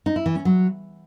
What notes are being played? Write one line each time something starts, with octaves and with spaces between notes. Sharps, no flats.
D#4
E4
E3
C#4
F#3